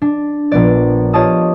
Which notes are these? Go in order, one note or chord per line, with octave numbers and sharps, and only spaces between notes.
D4
A#1 B3 D5
F4 G4 C#5 D#5 A5 D#6